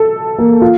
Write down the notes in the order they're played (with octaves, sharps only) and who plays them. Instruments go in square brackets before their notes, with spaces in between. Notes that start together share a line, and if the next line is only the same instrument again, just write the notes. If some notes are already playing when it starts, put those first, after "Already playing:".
Already playing: [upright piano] A4
A#3
F4